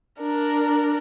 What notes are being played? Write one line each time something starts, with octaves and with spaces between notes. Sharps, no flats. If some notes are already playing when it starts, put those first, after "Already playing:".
D4 A#4